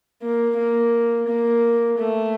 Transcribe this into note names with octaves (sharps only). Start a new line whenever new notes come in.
A#3
A#3
A#3
A3